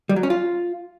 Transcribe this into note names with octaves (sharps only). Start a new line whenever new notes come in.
G3
F#3
C#4
F4